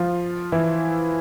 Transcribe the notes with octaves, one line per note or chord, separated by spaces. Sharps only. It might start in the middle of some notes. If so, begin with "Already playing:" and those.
Already playing: F3 F4
E3 E4